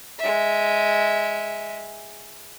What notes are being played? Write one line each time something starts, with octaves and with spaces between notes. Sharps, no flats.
G#3 E5